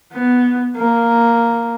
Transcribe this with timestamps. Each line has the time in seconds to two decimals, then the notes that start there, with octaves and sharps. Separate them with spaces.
0.13 B3
0.77 A#3